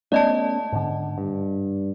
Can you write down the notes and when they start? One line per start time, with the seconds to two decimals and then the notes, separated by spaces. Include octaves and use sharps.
0.12 A3 B3 C#4 D5 D#5 A5
0.73 G#2 D3
1.18 G2